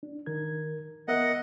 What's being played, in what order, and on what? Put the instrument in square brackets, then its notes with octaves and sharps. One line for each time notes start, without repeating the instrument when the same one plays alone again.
[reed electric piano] D4
D#3 A#4 G#6
[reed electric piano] B3 A#4 E5 [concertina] D#5 F#5